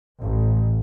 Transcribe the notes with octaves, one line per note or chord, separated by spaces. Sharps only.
A1